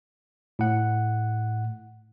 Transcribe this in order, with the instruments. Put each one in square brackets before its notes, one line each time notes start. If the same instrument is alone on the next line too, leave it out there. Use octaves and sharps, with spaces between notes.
[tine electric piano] A2 F#5